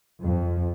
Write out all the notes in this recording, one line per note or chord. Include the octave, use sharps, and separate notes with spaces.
F2